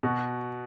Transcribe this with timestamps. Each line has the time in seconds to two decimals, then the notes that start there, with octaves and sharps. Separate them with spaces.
0.03 B2 F#4